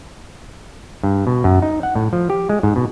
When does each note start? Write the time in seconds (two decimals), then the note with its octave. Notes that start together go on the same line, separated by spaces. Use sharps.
1.03 G2
1.27 B2
1.44 F#2
1.62 D#4
1.83 F#5
1.96 A2
2.13 F3
2.30 G4
2.49 G#3
2.63 G#2
2.76 B2